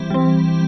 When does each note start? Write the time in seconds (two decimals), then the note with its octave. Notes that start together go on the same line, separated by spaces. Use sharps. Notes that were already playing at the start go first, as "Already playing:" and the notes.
Already playing: E3 G3 C4
0.10 G3 C4